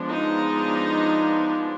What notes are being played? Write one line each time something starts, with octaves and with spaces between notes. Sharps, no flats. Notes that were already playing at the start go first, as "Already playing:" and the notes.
Already playing: F3 G#3 B3 D4
D#4